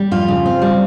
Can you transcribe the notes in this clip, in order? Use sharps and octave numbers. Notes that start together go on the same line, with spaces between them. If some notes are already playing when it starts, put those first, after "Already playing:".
Already playing: G3
F2 F4
C#3
C4
G3